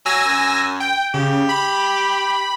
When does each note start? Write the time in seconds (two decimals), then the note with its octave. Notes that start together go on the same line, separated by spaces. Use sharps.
0.06 F#3 G#5 E6 A#6
0.25 F#2
0.80 G5
1.14 C#3 G4
1.49 B5